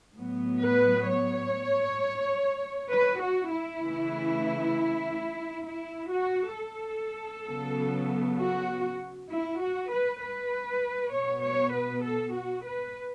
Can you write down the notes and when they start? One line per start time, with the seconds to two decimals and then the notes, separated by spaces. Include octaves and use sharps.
0.16 A2 F#3 B3
0.62 B4
1.07 C#5
2.90 B4
3.20 F#4
3.50 E4
3.81 C#3 E3 A3
5.64 E4
6.10 F#4
6.55 A4
7.46 C#3 F#3 B3
8.38 F#4
9.29 E4
9.60 F#4
9.90 B4
10.21 B4
11.12 B2 B3 C#5
11.43 C#5
11.73 B4
12.03 A4
12.33 F#4
12.64 B4